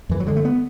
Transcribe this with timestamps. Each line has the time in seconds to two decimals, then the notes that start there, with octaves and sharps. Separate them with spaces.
0.09 F#2 E3
0.20 F#3
0.26 D3 G#3
0.36 A3
0.45 B3